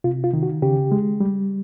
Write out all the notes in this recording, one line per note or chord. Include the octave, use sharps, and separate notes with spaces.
C3 F4
F4
D#3
F#4
C#3 G4
G#3
G3